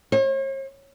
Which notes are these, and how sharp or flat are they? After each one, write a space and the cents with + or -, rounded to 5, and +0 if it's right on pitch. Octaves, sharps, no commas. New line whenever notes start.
C#5 -45